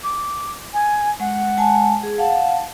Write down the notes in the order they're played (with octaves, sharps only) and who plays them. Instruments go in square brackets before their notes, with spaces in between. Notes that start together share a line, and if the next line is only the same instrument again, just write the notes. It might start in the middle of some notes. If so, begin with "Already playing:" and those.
[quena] D6
G#5
[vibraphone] G#3 [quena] F#5
[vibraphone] G#3 G#5 A5
G#4
[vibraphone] F5 F#5 [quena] A5